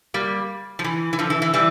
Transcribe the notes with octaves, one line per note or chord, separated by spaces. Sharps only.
G3 A#3
F3
E3
E3
D3 F3
E3
E3
E3 G3